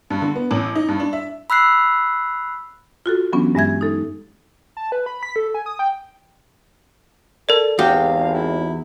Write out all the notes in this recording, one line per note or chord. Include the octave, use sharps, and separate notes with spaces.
G2
D3
B3
A1
D#4
G2
D4
E5
B5 E6 F#6 C7
F4 F#4 A4
E3 F#3 B3 C#4 D4
G2 G#3 E5 G#6
D#4 A4
A5
B4
B5
B6
A4
G#5
D#6
G5
A4 A#4 D5
G#1 E2 G4 F5
E4